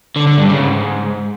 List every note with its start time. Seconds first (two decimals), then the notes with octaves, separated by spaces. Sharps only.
0.16 D3
0.27 D3
0.38 G2
0.49 C#3
0.60 G#2